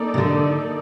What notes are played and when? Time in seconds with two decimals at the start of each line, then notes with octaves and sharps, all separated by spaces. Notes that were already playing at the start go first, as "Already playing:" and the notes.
Already playing: A#3 D#4 A4 D5
0.14 C3
0.18 D3